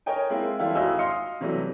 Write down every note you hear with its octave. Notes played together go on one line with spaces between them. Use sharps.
A#4 C#5 D#5 G5 G#5
G#3 A#3 C4 E4 F4
E3 G3 E4 F4 G4 A4
G#1 F4 F#4 D#5 G#5 E6
D#5 F5 C6 D#6 C#7
C3 E3 F#3 G3 A3